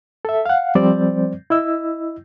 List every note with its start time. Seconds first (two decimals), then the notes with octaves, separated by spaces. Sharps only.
0.25 A4 E5
0.46 F5 F#5
0.75 F3 G3 C4 C5 D5
1.50 E4 D#5 E6